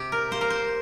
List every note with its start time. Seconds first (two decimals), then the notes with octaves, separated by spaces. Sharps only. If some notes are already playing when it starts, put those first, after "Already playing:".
Already playing: C3 G4
0.12 A#4
0.31 A#3 C5
0.41 A#4
0.50 C5